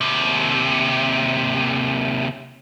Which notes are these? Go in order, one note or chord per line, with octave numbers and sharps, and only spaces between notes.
D#2 C3